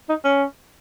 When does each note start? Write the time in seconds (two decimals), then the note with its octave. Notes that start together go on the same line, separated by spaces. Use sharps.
0.09 D#4
0.24 C#4